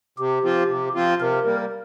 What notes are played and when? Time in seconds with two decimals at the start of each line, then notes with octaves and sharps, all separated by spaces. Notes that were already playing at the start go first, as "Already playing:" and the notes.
0.18 C3 G4
0.43 F3 C4 F4
0.68 C3
0.95 F3 C4 F4
1.19 C3 A#4
1.45 G3 A#3